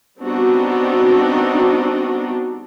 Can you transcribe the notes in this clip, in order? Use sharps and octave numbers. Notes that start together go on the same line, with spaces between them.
G3 B3 C4 D4 D#4 F#4